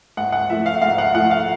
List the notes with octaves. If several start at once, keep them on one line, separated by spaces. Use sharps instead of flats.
G#2 F#5
F#5
F3 A3 E5
F5
G#2 F5
F#5
F3 A3 F#5
F5